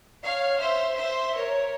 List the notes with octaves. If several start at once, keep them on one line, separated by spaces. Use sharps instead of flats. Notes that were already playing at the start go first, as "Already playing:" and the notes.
C#5 F5
C5 E5
C5 E5
A#4 C#5